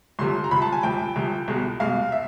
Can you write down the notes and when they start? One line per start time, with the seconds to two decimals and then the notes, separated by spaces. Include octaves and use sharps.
0.19 C2 C3 F3 C6
0.44 A#5
0.51 C2 C3 F3 B5
0.62 A5
0.72 G#5
0.83 C2 C3 F3 G5
1.16 C2 C3 F3
1.48 C2 B2 G#3
1.80 C2 B2 G#3 F5
2.12 E5